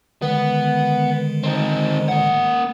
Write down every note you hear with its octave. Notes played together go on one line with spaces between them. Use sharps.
D3 D#3 G#3 B3
C4 D#4
A#3 F#5